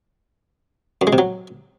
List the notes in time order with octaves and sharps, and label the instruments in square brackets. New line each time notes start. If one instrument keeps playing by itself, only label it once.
[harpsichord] F#2
G#3
C3
F#3